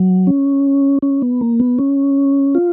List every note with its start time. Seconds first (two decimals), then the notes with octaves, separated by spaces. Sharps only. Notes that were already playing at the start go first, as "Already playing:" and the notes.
Already playing: F#3
0.27 C#4
1.02 C#4
1.22 B3
1.41 A#3
1.60 B3
1.79 C#4
2.55 F4